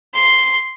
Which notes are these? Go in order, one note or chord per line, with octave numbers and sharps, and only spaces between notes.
C6